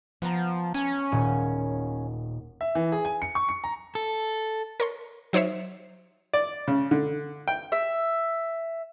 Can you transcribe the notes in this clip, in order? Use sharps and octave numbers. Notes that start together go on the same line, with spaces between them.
F3 B3 A#5
C#4 G#5
D#1 A#2 G#4
E5
E3
G#4
G#5
C#7
C#6
C#7
A#5
A4
A#4 C#5 C6
F#3 D#4 C5 C#5 E5
D5
C#3
D3
G5
E5